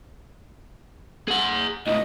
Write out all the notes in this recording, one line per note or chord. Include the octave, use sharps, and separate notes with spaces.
G#4 F#5
C#2 A2 D#5